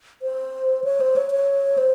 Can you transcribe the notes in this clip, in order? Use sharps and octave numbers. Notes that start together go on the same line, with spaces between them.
C5
C#5
C5
C#5
C#5
C5